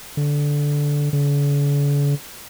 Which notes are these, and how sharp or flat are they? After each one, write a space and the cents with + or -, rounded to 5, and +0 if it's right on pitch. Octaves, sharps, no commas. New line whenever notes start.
D3 -10
D3 -45